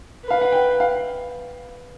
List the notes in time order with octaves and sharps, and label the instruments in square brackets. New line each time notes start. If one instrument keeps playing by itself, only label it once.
[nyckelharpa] B4
[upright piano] F5
F#5
G5
F5